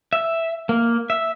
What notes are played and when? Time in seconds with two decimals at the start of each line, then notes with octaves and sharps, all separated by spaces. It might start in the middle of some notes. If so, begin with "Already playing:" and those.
0.13 E5
0.69 A#3
1.10 E5